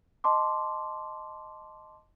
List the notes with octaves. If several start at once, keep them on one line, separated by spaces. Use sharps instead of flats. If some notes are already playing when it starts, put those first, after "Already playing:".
D#5 A5 C6 D6